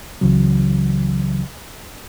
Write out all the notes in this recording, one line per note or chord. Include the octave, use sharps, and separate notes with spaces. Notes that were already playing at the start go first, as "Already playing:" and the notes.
C#2 C#3 E3 F#3